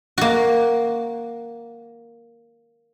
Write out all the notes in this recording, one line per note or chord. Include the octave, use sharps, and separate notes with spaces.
A#3 F#4